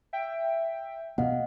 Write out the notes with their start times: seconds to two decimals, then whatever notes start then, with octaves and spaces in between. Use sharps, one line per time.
0.13 E5 G5
1.18 B2 A#3 D#5 F5 F#5